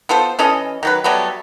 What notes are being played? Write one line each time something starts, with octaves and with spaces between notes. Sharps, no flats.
B3 F4 A4 C5
E3 C#4 A4 D#5
D#3 F#3 B4
F#3 G3 A3 B3